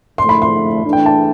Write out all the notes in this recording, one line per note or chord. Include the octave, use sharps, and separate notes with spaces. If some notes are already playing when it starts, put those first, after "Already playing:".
F2 D3 F3 A3 E4 C6
B5
C6
E3 A3 D4
G5
A5